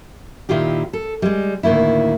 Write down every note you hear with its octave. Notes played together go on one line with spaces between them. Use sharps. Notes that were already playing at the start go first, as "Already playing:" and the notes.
A#2 D#3 E4 F4 G4
A4
G3 G#3
D2 A2 D#3 A#3 E4